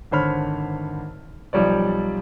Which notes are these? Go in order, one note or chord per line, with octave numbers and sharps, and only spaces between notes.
G#1 D3 C5 C#5 B5 F6
B1 F3 G3 C#5 D5